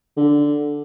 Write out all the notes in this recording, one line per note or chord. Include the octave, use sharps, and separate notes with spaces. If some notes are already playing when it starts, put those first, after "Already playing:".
D3